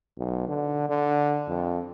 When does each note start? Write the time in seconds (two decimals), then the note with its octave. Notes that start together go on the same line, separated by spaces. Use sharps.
0.18 B1
0.49 D3
0.89 D3
1.48 F2